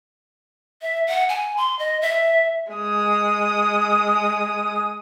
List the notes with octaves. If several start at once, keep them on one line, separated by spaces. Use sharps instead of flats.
E5
F#5
G#5
C6
D#5
E5
G#3 D#6